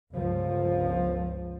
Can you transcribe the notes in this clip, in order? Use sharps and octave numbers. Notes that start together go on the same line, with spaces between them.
G1 C#2 F3